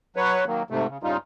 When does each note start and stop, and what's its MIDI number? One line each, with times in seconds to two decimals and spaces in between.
0.16 0.45 54
0.16 0.45 71
0.16 0.45 73
0.47 0.63 51
0.47 0.63 54
0.47 0.63 58
0.70 0.87 44
0.70 0.87 48
0.70 0.87 57
0.89 0.98 49
1.03 1.17 43
1.03 1.17 49
1.03 1.17 55
1.03 1.17 63
1.03 1.17 65